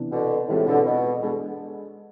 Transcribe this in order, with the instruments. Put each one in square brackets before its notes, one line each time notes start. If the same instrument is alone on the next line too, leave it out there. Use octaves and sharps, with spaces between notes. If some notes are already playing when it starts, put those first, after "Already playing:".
Already playing: [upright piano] C3 E3 B3 D4
[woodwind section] B2 D3
[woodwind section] A2 C3 [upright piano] E3 G#3 C4 F4 G#4
[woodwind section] B2 D3
B2
[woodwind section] B2 [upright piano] G#3 D4 A4